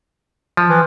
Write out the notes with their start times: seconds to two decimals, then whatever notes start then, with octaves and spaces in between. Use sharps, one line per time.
0.57 F3
0.69 E3